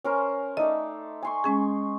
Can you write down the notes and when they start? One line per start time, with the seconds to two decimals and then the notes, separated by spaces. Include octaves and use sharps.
0.04 C#4 A#4 C5
0.57 A3 D#4 D5 D#5
1.22 G#5 C6 C#6
1.44 G#3 C#4 G#4